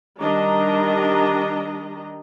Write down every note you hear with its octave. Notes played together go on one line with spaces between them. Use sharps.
D#3 G3 D4 D#5 A#5